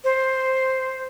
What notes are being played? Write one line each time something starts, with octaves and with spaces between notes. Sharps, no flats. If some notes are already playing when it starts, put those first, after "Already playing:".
C5